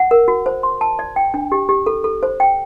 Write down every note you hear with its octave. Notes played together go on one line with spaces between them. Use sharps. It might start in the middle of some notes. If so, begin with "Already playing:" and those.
Already playing: F#5
A#4
F#4
C5
C6
A5
D5
G5
D4
G4
G4
A4
A4
C5
G5